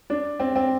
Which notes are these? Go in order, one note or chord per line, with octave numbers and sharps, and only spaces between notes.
D4
C4
C4